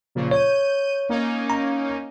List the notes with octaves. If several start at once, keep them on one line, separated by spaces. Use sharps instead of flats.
A#2 C#3 F3
C#5 G6 D#7
A#3 C#4 D#4
A#5